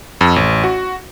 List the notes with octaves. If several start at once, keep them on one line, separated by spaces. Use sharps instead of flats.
F2
A1
F#4